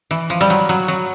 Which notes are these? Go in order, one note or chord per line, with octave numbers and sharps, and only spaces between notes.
E3
F3
G3
F#3
F#3
F#3